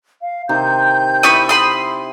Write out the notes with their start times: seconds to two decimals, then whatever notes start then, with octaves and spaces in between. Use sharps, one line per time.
0.21 F5
0.49 C3 D#3 G6
1.23 E4 B4 C#6 D#6
1.49 B5 C6 D#6